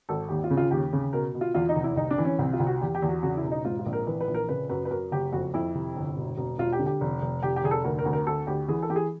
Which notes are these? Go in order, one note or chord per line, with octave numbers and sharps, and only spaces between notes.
G#1 A4
D#2 G4
F4
C#3
F4
D#2 G4
C#3
B2 A#4
B2
F4
E2 F4
D#4
F1
E4
C2 D#4
D4
E3
C#4
C2 C4
F4
C2
F#4
E2 G4
G4
E2
F#4
C#3 F#4
E4
E1
D#4
G#2 F4
F4
A#1
A#4
E3 B4
B4
A#1
A#4
C#3 B4
F#2 B4
B4
F#2 A#4
F#1 G4
F2 F#4
F2 E4
C3
G1
E1
E1
E1 F4
G4
D3
G4
F1
F1
F1 G4
G4
F1 G#4
A4
D2 A#4
A#4
D2
A#4
D2 A4
D2 G4
E3 G#4
A4
E3 G4
G#4